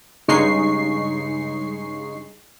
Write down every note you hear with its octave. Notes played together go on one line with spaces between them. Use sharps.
G2 C#3 G#3 D#4 C#6 C7